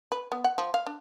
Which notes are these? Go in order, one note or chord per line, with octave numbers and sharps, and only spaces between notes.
B4
B3
F#5
F3
F5
D4